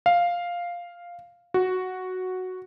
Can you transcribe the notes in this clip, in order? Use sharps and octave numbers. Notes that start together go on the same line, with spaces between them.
F5
F#4